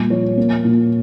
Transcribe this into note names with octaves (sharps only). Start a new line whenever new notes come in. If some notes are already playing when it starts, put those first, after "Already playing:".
Already playing: A#2 G3
F3 C#5
A#3
A#2